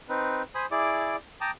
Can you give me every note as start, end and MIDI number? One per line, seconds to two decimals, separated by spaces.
0.09 0.42 60
0.09 0.42 63
0.09 0.42 71
0.55 0.66 72
0.55 0.66 80
0.55 0.66 83
0.55 0.66 87
0.71 1.16 64
0.71 1.16 68
0.71 1.16 74
0.71 1.16 86
1.41 1.51 79
1.41 1.51 81
1.41 1.51 82
1.41 1.51 86
1.41 1.51 87